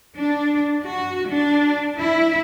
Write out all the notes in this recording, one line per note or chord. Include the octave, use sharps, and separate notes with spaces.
D4
F#4
D4
E4